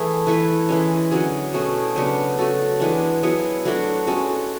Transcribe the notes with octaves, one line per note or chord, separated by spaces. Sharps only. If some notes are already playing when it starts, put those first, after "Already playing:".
Already playing: E3 A3 E4 G#4
E3 A3 E4 B4
E3 G#3 C#4
D3 F#3 C#4 G#4
B2 A3 C#4 G#4
C#3 F#3 B3 D4
A3 C#4 F#4 A4
E3 G#3 B3 D4
F#3 B3 E4 G#4
F#3 A3 D4 F#4
G#3 C#4 F#4 A4